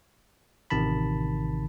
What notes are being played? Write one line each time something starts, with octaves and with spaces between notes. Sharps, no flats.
A1 C3 D#3 A5 B5